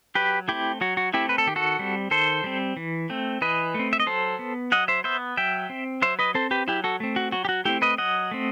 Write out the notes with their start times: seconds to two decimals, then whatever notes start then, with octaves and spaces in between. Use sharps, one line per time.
0.15 F#3 G4 B4
0.48 A3 C4 E4 G4
0.81 F#3 F#4
0.97 F#4
1.13 A3 C4 E4 G4
1.29 B4
1.38 A4
1.47 D#3 G4
1.56 F#4 A4
1.79 G3 C4
2.11 D#3 A4 C5
2.44 G3 C4
2.77 E3
3.10 A3 C4
3.41 E3 B4 D#5
3.74 A3 C4
3.93 E5
4.00 D#5
4.06 F#3 A4 C5
4.39 B3
4.72 F#3 D#5 F#5
4.88 C5 E5
5.04 B3 C5 E5
5.37 F#3 E5 G5
5.70 C4
6.02 F#3 C5 E5
6.19 B4 D#5
6.35 C4 A4 C5
6.51 G4 B4
6.68 F#3 E4 G4
6.84 F#4 A4
7.00 A3 C4
7.16 F#4
7.32 F#3 F#4
7.45 G4
7.49 F#4
7.65 A3 C4 E4 G4
7.82 B4 D#5
7.98 F#3 D#5 F#5
8.31 A3 C4